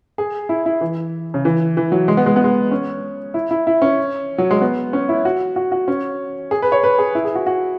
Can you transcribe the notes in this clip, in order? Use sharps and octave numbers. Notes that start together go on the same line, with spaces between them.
G#4
E4
E4
E3
C#3
E3
E3
F#3
G#3
B3
G#3
B3
G#3
C#4
E4
E4
E4
C#4
F#3
G#3
B3
C#4
E4
F#4
F#4
F#4
C#4
G#4
B4
C#5
B4
G#4
E4
G#4
F#4
F#4